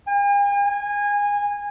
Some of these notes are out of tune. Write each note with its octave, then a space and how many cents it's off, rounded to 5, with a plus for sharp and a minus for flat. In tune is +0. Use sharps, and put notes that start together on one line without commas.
G#5 -45
G#5 -20